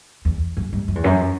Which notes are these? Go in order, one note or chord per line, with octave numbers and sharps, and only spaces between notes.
E2
F#2
G2
F#2
E2
F#2